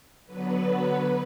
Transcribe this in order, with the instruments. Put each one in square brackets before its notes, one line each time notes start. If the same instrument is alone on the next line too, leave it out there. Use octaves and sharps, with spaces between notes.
[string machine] D3 F#3 B3 B4